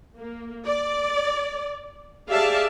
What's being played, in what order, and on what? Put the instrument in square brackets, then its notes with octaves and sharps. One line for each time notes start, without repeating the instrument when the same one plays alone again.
[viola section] A#3
D5
G4 G#4 D5 E5 F5 A5